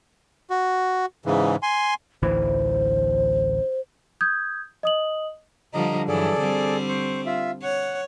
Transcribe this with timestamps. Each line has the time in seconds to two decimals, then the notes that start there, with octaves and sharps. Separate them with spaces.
0.50 F#4
1.26 G#2 C#3 E3
1.63 G#5 C6
2.22 A1 D2 E3 C5
4.21 D#6 G6 G#6
4.83 D#5 D#6 F#7
5.74 D3 F3 G3 D#5 A#5
6.08 G2 E3 F#3 G#4 A4 D5
6.40 D3 G3 C4
6.89 C5 C#6
7.26 F4 E5
7.63 C#5 F#5